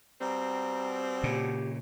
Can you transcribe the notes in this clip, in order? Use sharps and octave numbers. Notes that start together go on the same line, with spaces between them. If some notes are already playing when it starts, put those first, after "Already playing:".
B2 G3 C4 A#5
A#2 C#3 G4